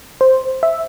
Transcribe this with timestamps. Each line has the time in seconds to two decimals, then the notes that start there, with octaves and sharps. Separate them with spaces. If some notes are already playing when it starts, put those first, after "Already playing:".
0.21 C5
0.63 E5